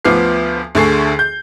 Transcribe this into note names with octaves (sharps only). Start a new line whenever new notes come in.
D2 F3 B3 D6 F6 C7
D2 D3 G#4 A4 C#6 C7
G6